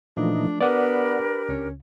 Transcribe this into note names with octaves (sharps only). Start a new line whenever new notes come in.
A#2 E3 F3 A3 D4 D#4
B3 D4 G4 A#4 B4 D5 F#5 D6
C#2 C#4